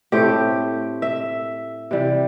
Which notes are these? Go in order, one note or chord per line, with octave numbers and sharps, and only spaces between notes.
A2 A3 C4 G4
E5
C3 E3 G3